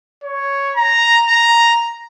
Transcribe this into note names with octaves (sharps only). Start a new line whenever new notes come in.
C#5
A#5
A#5